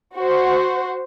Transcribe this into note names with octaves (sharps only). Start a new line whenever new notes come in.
F#4 C5